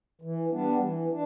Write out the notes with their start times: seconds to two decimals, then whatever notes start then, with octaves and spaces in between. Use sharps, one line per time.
0.22 E3
0.51 G3 B3 D4
0.81 E3
1.11 D4